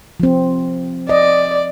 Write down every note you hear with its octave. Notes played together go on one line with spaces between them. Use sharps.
F3 C4
D5 D#5